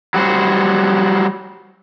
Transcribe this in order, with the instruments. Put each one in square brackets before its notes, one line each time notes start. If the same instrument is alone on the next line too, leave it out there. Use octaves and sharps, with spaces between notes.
[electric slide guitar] F#3 G3 F#4 C5